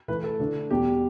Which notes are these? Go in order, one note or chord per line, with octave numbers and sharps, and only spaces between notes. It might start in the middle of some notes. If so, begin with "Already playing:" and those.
E3 A3 E4 B4
A4
D3 A3 D4
E2 B2 G3 G4